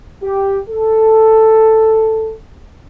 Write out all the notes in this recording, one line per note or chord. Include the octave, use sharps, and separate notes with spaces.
G4
A4